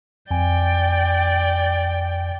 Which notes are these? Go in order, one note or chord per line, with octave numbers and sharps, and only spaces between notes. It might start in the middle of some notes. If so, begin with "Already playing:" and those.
F2 D5 G5 G#5